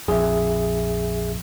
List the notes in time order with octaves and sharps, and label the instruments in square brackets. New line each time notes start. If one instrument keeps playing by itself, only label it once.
[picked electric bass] A#1 F2 [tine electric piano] G#4 E5